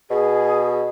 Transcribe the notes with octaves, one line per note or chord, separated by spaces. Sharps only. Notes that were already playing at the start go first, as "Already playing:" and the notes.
B2 G#4